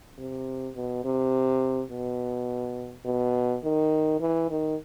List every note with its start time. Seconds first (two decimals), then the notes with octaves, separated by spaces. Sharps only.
0.18 C3
0.75 B2
1.04 C3
1.91 B2
3.05 B2
3.64 D#3
4.20 E3
4.50 D#3